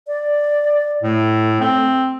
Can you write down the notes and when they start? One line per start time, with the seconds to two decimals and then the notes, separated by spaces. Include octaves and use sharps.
0.07 D5
1.03 A2 A3
1.61 C4